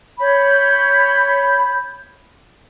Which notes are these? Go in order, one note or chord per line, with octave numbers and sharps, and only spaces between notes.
C#5 B5 G6